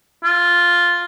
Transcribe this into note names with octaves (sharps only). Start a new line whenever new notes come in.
F4